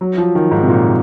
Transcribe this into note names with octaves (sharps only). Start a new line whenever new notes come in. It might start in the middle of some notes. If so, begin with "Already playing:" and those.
F#3
F3
D#3
G#2
C3
A#2